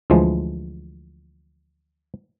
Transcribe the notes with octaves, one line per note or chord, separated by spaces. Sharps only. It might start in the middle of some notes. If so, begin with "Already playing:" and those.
D2 E3 F3 G#3